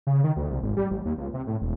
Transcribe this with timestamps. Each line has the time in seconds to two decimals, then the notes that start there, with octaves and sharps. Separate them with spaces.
0.07 C#3
0.24 D#3
0.36 D2
0.50 C2
0.63 G#1
0.77 G3
0.91 A1
1.05 D#2
1.18 C#2
1.34 C3
1.47 A2
1.62 E1